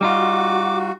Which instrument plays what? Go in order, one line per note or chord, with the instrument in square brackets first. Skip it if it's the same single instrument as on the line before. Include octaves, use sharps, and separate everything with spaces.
[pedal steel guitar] G3 D#4 F4 [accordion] F#4 [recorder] D6